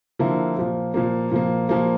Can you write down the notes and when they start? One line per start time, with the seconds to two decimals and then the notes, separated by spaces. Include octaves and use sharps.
0.19 D3 F3 A#3 E4
0.57 A#2 F3 A#3
0.94 A#2 F3 A#3
1.31 A#2 F3 A#3
1.69 A#2 F3 A#3